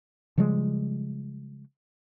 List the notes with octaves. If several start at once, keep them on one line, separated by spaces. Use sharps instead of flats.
C#3 F3 G3 G#3